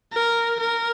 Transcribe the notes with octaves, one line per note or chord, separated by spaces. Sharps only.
A#4
A#4